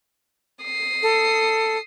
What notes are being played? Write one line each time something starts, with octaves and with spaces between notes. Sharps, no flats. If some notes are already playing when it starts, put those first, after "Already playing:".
D#6 C7
A4